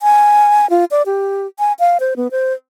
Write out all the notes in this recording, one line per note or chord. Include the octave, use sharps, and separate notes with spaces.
G#5
F4
D5
G4
G#5
F5
C5
B3
C5